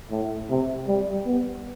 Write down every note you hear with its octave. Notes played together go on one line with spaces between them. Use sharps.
A2
C3
G3
B3